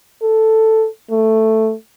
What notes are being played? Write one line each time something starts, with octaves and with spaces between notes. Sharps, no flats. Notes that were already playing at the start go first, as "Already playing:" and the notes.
A4
A3